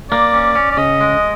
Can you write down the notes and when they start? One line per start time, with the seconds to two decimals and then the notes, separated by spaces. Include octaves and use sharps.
0.11 A#3 D5
0.34 C#4
0.55 C#4
0.72 D5
0.77 C#3 D#5
1.01 G#3